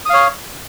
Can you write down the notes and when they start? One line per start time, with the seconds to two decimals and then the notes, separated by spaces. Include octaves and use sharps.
0.06 D#6
0.10 F5
0.14 C#5